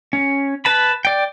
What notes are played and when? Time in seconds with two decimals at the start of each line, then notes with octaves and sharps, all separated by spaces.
0.13 C#4
0.65 B4 A5 B5
1.05 D5 G5